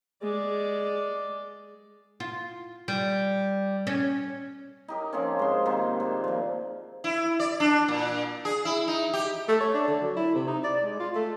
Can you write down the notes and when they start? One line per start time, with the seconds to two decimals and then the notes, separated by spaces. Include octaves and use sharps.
0.23 G#3 D5
2.20 F4
2.88 G3
3.87 C#4
4.88 D#4 G4 A#4
5.13 F3 A#3 C4 C#4
5.39 G#2 C6
5.66 C3 D#3 A#3 C4
6.00 A#2
6.24 F3 A#3
7.04 E4
7.40 D5
7.60 D4
7.88 A#2
8.45 G#4
8.65 E4
8.88 D#4
9.13 G4
9.48 A3
9.61 C#5
9.74 D4
9.88 D3
10.02 F#3
10.16 E4
10.35 C3
10.47 D#4
10.64 D5
10.83 G#3
11.00 F4
11.15 A3